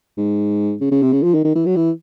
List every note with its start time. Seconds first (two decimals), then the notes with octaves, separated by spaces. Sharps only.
0.17 G#2
0.81 C#3
0.91 C#3
1.02 C3
1.12 C#3
1.23 F3
1.34 D#3
1.44 D#3
1.55 E3
1.66 F#3
1.76 E3